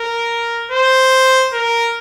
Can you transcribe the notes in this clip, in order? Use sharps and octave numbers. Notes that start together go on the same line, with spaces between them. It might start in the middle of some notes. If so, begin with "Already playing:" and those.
Already playing: A#4
C5
A#4